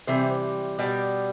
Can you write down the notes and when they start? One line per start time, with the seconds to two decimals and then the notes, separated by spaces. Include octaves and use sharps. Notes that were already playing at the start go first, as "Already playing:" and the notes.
0.07 C3 E3 G3 C5
0.79 B2 G3 D5